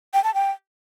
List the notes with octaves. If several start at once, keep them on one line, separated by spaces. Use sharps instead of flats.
G5
A5
G5